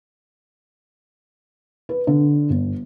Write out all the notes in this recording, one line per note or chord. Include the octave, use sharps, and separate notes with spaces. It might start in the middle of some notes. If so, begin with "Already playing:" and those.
B4
D3
G1